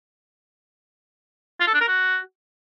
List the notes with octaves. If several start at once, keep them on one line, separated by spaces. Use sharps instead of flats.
F4
A4
D4
A#4
F#4